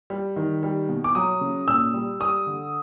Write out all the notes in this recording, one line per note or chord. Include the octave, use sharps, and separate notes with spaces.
G3
D#3
G3
B2
D6
F#3 D#6
C#3
A#2 E6
G3
G3 D#6
D3